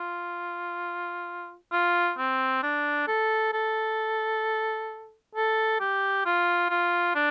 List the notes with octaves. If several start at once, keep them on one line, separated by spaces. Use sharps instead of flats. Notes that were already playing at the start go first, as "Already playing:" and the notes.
Already playing: F4
F4
C4
D4
A4
A4
A4
G4
F4
F4
D4